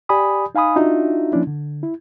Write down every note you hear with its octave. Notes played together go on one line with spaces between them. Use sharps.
G4 D5 G#5 B5 D#6
D#4 F5 G#5 B5 D#6
D4 D#4 F4 F#4 E5
F3 A#3 C#4 D4 E4
D3
E4